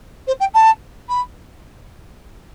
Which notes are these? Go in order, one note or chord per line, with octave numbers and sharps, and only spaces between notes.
C5
G5
A5
B5